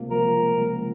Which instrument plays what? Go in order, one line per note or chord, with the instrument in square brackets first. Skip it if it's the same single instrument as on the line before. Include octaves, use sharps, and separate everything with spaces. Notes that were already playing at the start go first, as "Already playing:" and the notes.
Already playing: [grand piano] C#2 C3 A#3
[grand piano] F3 [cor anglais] A#4
[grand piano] A#3
C#2